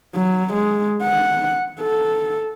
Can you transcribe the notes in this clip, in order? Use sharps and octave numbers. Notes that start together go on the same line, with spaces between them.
F#3
G#3
F#5
A4